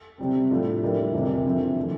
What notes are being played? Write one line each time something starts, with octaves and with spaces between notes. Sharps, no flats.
C3 G3 C4
A2 F3 A3 D4 F4
D3 G3 A#3 E4
F2 C3 E3 A#3
D3 F3 C4 E4
E3 A3 D4